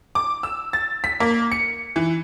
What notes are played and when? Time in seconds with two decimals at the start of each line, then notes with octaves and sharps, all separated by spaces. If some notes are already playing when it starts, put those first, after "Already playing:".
0.15 D6
0.43 E6
0.73 A6
1.04 B6
1.20 A#3
1.52 C#7
1.96 E3